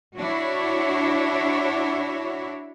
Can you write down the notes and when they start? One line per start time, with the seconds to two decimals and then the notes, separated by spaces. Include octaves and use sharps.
0.17 D4 E4 F#4 C#5